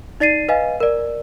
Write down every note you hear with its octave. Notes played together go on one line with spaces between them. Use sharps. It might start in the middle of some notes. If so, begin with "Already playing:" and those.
D#4 D5 A6 C7 D#7
B4 D#5 F5 G#5
A#4 D5